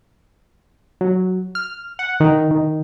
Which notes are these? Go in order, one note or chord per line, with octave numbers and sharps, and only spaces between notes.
F#3
F6
F#5
D#3
D#3